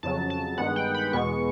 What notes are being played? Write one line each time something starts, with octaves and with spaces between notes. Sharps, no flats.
F2 C#3 F#3 A5
A5
G2 D#3 G#3 B3 F#5
G5
B5
E2 B2 G#3 B3 C#6